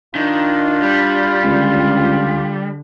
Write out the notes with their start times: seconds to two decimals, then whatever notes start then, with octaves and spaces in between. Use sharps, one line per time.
0.15 D#3 D4 F4
0.82 G3
1.44 C#2 D3